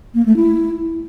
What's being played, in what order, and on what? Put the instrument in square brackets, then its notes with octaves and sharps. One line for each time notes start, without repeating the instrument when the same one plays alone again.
[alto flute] A#3
A3
E4